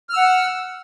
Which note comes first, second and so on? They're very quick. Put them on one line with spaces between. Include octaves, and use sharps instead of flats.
F6 E6 F#5